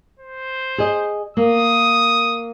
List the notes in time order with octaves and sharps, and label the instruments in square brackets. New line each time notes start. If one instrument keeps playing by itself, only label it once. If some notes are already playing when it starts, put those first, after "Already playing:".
[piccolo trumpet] C5
[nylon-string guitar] G#4 D#5
[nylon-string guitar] A#3 [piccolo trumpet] D#6